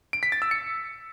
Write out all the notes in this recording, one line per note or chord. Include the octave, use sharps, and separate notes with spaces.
D7
B6
A6
E6
C#7